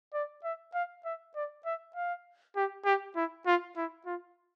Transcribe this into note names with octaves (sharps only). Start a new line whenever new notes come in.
D5
E5
F5
E5
D5
E5
F5
G4
G4
E4
F4
E4
F4